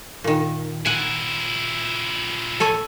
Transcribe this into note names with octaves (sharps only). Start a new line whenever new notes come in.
A#2 D#3
A#2 E4 F#5 G#5
A4 C#5 G#5